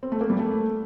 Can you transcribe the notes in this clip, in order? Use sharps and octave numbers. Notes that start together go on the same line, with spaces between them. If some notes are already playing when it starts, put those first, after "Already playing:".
C4
A3
A#3
G3
A3